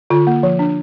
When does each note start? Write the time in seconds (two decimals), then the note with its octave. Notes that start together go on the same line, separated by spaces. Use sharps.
0.10 D3 F4
0.27 A#3
0.43 F3
0.59 D4